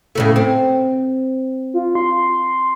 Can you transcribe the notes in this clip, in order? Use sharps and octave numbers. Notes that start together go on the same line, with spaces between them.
A2 C#3 A3
C4
F4
C6